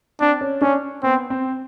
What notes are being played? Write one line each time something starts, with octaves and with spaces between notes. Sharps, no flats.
C4 D4
C#4
C#4 D4
B3 C4
C4